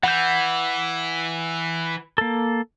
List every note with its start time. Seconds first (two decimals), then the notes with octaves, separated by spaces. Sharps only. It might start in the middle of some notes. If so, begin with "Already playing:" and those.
0.03 E3 F#5 G6
2.18 A#3 A4